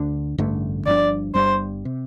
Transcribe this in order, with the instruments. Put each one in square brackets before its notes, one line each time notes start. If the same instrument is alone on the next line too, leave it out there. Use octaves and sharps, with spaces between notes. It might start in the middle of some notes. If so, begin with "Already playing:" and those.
Already playing: [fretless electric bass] D2 D3 D4
A1 G2 D3 A3
[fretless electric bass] G1 G2 F3 D4 [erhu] D5
[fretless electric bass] G1 G2 G3 [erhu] C5
[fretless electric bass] C3